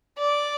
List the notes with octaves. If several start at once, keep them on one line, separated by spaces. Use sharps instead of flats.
D5